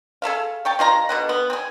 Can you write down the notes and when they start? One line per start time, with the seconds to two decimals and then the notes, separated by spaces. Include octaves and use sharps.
0.22 G#4 A4 E5 F5
0.65 C#5 G5 A5
0.79 G#3 F4 C#5 A#5
1.09 B2 D3 F#5
1.29 B3
1.50 C4 G#4